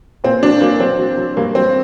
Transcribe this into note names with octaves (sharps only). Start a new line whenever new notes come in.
A#2 C4
F#3 D4
F#3 A#3
F#3 C4
F#3
F#3
G2 A#3
F#3 C4